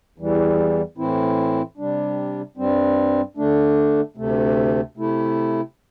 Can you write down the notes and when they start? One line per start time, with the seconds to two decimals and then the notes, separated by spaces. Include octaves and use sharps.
0.18 E2 E3 G3
0.98 A2 E3 C4 E4
1.77 C3 G3 D4
2.57 G2 G3 C4
3.37 D3 A3 D4
4.17 D2 C3 A3
4.97 C3 A3 E4